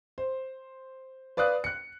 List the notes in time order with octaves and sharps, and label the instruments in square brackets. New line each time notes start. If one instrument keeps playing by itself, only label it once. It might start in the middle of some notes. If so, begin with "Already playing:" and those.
[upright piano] C5
B4 D5 F5 D#6 F#6
F#6 C#7